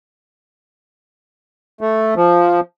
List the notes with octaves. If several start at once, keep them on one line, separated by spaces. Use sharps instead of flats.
A3
F3